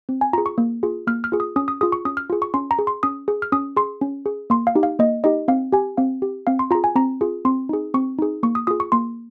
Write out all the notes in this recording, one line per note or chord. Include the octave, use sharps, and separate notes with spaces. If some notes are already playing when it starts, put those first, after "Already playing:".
C4
G#5
F4 G#4 A#5
C#6
A#3
F4 G#4
A#3 F6
F6
F4 G#4
D#6
C#4 D#6
D#6
F4 G#4 D#6
C#6
C#4 D#6
F6
F4 G#4
C#6
C#4 C6
A#5
G#4
C6
C#4 D#6
G#4
F6
C#4 D#6
G#4 C6
C#4
G#4
A#3 C6
F5
D#4 G4
F5
A#3 D#5
D#4 G4 D#5
C4 F5
G4 G#5
C4 F5
G4
C4 F5
C6
F4 G#4 A#5
G#5
C4 A#5
F4 G#4
C4 C6
D#4 G#4
C4 C#6
D#4 G#4
A#3 C#6
D#6
F4 G#4 D#6
C#6
A#3 C6